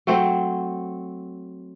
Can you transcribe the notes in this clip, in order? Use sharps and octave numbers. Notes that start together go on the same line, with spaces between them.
F#3 A3 C4 C5